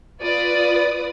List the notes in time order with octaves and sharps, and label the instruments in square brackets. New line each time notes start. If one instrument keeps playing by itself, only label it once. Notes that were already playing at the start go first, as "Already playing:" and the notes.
[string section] F4 B4 D5 D#6